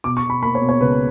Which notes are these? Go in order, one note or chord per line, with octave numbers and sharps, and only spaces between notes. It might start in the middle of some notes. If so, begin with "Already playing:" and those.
B2 D6
C#6
B2
B5
A#3 B5
C#5
B2
C#5
C#2 B4